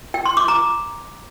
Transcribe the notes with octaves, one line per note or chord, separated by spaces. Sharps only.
G5
C6
D6
A#5